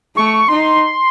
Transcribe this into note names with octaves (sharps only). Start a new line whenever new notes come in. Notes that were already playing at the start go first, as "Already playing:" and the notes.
A3 C#6
D#4 C6